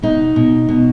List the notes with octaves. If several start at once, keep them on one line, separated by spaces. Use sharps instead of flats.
B2 D#4
B2
B2